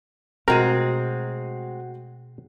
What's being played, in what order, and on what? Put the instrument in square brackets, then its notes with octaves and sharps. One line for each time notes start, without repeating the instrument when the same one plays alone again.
[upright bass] B2 A3 [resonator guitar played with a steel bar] G#3 C4 [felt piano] F#4 D#7 [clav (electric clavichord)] A#4